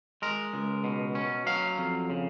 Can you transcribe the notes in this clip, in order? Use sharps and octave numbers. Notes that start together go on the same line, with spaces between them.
G#3 A#4
C#2
B2
C#4
F#3 F5
F2
C#3